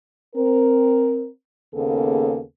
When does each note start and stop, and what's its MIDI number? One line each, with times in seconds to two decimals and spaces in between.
0.36 1.28 60
0.36 1.28 70
1.75 2.41 39
1.75 2.41 49
1.75 2.41 58
1.75 2.41 59
1.75 2.41 68
1.75 2.41 69